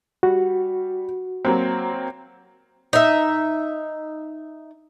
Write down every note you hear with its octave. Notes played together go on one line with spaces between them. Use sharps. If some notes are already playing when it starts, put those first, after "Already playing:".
G3 F#4
F#3 A#3 C4
D#4 E5